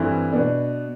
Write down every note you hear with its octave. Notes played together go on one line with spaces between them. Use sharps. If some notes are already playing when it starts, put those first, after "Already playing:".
Already playing: G2 E3 A3 C4 E4
B2 B3 D4